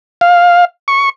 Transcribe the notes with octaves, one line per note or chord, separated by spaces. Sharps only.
F5
C#6